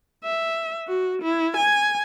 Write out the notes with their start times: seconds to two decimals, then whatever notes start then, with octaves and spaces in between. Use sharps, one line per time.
0.24 E5
0.87 F#4
1.22 E4
1.57 G#5